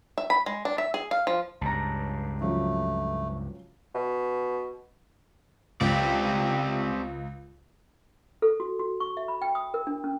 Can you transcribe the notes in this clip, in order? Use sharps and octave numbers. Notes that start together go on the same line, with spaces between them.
E5
B5
G#3
D4
E5
G#4
F5
F3
C#2 G2 A5 A#5
C#3 F3 F#3 A3
B2
C#2 C4 G4 D5
A4
F#4
F#4
C#6
E5
B5
G5
D#6
A#4
D4
C#4